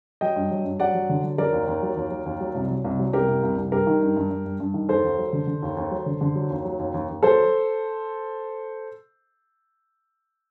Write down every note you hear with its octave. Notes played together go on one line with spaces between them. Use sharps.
F#3 D#5 G5
G2
F#3
G2
F#3 D5 F#5
F#3
D3
F#3
F#3 A#4 D5
D#2
D#2
F#3
D#2
F#3
D#2
F#3
C2
F#3
C2
F#3
C2 G4 A#4
C2
C2
C2
G2 G4 A#4
D#3
G2
G2
G2
G2
G2
D#3
D#2 A4 C5
D#2
F#3
D3
D3
D#2
D#2
F#3
D3
D3
F#3
D#2
F#3
D#2
D#2
D#2
F#3 A4 C5